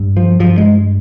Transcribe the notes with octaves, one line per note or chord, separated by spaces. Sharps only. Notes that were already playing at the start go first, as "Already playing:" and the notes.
Already playing: G2
F3
G2 F3
G#3